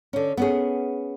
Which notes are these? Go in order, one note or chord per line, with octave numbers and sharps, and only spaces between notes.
D3 C#4
B3 C#4 G#4